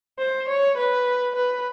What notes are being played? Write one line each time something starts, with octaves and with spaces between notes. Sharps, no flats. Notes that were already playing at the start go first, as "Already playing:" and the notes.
C5
C#5
B4
B4